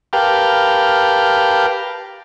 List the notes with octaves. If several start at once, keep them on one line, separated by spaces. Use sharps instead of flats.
G4 A#4 B4 F5 G5 A5